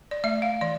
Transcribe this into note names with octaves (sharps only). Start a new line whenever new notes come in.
D5
A3 E5
F5
E3 D5